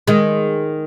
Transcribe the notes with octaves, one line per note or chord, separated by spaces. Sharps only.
D#3 G#3